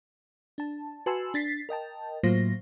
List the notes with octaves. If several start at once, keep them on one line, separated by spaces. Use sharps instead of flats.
D4 A5
F#4 B4 G#5 A5 C6 E6
D4 A6 B6 C7
A#4 D#5 G5 A5
A2 F#3 A#3 F4 C5 A#6